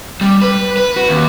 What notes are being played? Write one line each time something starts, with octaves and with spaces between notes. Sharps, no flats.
G3
B4
B4
F#4
D#2